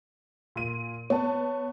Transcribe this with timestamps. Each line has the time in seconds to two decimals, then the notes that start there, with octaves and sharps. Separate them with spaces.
0.56 A#2 D#7
1.10 B3 C#5 A5